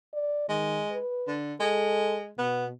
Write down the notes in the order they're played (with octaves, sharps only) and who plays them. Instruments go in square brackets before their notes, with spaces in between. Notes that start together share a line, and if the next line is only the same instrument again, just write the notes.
[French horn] D5
[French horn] D#3 [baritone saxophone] G#3
[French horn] B4
[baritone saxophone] D3
[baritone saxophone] G#3 [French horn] A4
[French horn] B2 [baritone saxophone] B3